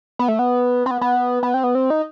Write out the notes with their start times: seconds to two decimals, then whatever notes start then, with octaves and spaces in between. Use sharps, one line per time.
0.19 B3
0.28 A3
0.39 B3
0.86 C4
0.91 B3
1.01 B3
1.43 B3
1.54 C4
1.64 B3
1.75 C4
1.90 D#4